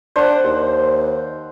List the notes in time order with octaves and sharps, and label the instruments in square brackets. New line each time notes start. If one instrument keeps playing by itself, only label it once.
[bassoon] D4 [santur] C5 F#5
[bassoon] D#2